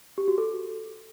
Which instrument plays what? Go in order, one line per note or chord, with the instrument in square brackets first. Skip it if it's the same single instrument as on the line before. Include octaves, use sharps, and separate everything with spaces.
[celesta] G4
F#4
A4